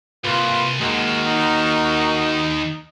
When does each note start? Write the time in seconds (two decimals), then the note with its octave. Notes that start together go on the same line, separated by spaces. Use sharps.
0.24 C2 A#3 F4 B4
0.80 D#2 G#3 F#4 A#4
1.26 D#4